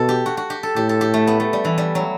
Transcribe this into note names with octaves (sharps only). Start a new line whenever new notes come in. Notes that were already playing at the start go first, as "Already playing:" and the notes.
Already playing: B2 A4
G4
F#4
F#4
G4
A4
A2 G4
A4
G4
A3
B3
A3
G3
E3
G3
F#3